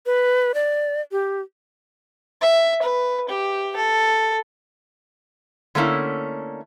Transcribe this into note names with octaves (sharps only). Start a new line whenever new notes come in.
B4
D5
G4
E5
B4
G4
A4
D3 A3 A#3 C#4 E4